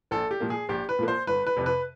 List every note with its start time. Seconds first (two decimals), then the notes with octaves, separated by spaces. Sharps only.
0.11 A#1 A4
0.31 G4
0.40 A#2 F3 A#3
0.50 G#4
0.69 A#1 G4
0.89 B4
0.99 A#2 F3 A#3
1.08 C5
1.27 G1 B4
1.47 B4
1.56 F2 C3
1.66 B4